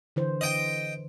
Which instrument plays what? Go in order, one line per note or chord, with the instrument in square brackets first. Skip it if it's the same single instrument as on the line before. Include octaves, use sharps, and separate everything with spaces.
[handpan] D3 E3 C5
[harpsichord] D#5 G5